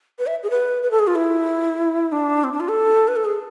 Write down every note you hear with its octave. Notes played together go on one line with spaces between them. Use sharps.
B4
E5
G#4
B4
B4
A4
G#4
F4
E4
D4
C4
D4
F4
A4
B4
A4
G#4